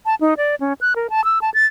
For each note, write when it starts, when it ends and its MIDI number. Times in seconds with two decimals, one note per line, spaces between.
0.06 0.15 81
0.21 0.34 63
0.37 0.55 74
0.60 0.73 61
0.81 0.94 90
0.96 1.07 70
1.10 1.23 81
1.24 1.39 88
1.42 1.50 81
1.54 1.66 93